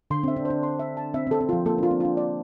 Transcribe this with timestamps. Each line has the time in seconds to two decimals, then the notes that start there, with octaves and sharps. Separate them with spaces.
0.10 D3 C6
0.23 C4 E5
0.36 D4
0.45 C5
0.50 D4
0.63 C6
0.79 E5
0.97 A5
1.14 C4 E5
1.27 C4 A4
1.41 C4
1.49 F3 F4
1.66 A#3 A4
1.78 D4 F4
1.91 C4
2.00 D4 F4
2.17 D5